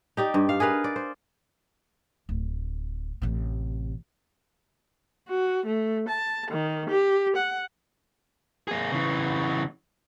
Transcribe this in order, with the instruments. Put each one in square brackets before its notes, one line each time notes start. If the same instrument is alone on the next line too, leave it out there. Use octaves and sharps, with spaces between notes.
[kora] D#4 G4 D5
G2
F5
G#4 A#4 B4 F5
D5
C5
[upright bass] D1
A1 C3
[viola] F#4
A3
A5
D#3
G4
F#5
[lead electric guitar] A#3 G#4
C#3 E3